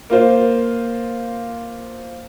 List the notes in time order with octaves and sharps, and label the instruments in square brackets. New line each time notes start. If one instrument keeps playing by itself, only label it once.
[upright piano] A#3 F4 C5